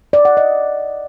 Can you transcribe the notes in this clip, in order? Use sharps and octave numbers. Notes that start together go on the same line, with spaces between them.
D5
F#5
D#5